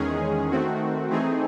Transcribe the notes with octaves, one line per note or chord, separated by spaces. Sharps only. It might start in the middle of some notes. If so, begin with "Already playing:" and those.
Already playing: E2 D#3 G#3 C#4 G#4
D#3 A3 C4 F#4
E3 A3 C4 D#4 G#4